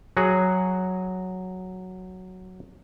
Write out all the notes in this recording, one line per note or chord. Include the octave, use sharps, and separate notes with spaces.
F#3 F#4 G#4